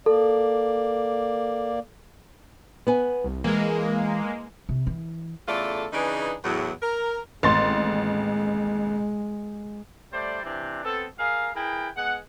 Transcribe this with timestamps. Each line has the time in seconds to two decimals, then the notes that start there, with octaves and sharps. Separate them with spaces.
0.06 A#3 A4 D5
2.87 B3 B4 G#5
3.24 C2
3.44 E3 G#3 A#3
4.69 C3
4.87 E3
5.48 E2 C#3 A3 F4 A4 D5
5.93 C#3 E3 D4 D#4 G#4 B4
6.44 E2 A2 F#3
6.82 A#4
7.43 A1 D#2 G#3 C4 C6 A6
10.12 G3 A3 C5 D5
10.44 C3 E3 C4 D4
10.84 B3 C4 A4
11.18 G#4 A#4 F5
11.55 E4 G#4 A#4 B4 G5
11.96 G#3 B3 F#5